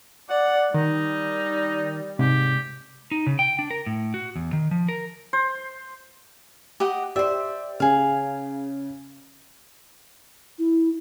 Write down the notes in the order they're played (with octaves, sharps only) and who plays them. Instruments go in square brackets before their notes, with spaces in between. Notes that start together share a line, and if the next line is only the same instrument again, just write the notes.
[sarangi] D5 [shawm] F#5
[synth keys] D#3 [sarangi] G3 [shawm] D#4
[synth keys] G#2 [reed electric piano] C3 [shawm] G4
[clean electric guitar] D#4
C#3
G5
D4
A#4
A2
F#4
E2
D#3
F3
A#4
[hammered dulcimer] C5
[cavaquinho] G4 D#5 F#5
[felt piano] G4 D5 [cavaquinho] C5 E5
[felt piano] C#3 [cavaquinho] G#4 F5
[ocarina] E4